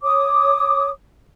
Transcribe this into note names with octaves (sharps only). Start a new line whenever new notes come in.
C#5 D6 D#6